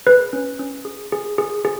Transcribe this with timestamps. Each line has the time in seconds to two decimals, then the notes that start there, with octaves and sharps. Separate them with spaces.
0.07 G#4 B4
0.33 C#4
0.59 C#4
0.85 G#4
1.12 G#4
1.38 G#4
1.65 G#4